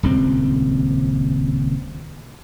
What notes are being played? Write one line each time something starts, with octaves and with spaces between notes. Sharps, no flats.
D#1 C#2 C4